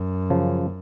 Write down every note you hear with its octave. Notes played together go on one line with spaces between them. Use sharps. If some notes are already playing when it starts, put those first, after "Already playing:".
Already playing: F#2
C#3 F3